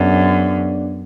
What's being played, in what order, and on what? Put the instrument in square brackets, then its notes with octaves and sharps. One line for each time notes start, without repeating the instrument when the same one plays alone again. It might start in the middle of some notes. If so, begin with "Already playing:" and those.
Already playing: [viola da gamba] F#2 [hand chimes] B3 D4 G#4 D5